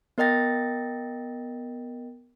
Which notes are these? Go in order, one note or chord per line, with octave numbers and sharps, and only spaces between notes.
B3 A#4 D#5 G5 A6 A#6